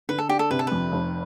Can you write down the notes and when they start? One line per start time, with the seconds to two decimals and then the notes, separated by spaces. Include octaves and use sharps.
0.09 D3 B4
0.19 A4
0.29 D4 G4
0.39 A4
0.51 C3 B4
0.59 A4
0.67 F2 B4
0.92 F1